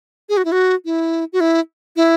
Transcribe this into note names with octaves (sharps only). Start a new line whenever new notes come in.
G#4
F#4
E4
F#4
E4
F#4
E4
E4